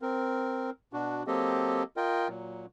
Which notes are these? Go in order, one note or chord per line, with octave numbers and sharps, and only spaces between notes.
C4 A#4
B2 D4 F#4
F#3 A#3 C4 G4 A4 D#5
F4 A#4 D#5 G5
A#2 F#3